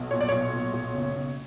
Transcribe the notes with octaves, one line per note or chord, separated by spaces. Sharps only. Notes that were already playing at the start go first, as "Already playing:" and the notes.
Already playing: B1
A#2 C#5
D5
B1 C#5
A#2
B1
F#1
F#1